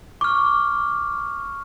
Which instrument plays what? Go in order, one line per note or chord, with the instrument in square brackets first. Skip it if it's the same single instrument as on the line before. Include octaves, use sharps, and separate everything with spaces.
[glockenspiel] C#6 F6 [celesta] D6